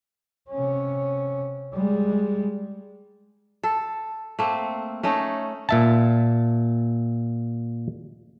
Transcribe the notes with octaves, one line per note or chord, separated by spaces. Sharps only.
C3 C#4
G3 G#3
A4
A3 A#3 C4
A3 C#4 D#4
A#2 E5 A5